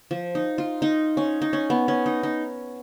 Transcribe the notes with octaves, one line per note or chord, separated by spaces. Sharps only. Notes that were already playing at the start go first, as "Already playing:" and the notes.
F3
D#4
F4
D#4
C#4
D#4
C#4
B3
C#4
D#4
D#4